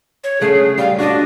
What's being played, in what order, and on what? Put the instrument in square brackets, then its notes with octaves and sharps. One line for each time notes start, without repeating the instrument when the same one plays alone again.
[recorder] C#5
[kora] C#3 A3 F#5 [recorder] G#4
[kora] G3 [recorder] F5
[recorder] D4 [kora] F#4 D#5